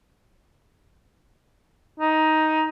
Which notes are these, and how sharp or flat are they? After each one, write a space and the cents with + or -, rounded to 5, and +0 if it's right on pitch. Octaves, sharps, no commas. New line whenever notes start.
D#4 +10